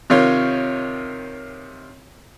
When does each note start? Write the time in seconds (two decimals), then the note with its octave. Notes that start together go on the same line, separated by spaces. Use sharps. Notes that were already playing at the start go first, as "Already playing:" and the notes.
0.10 C3 D#3 F4 C#5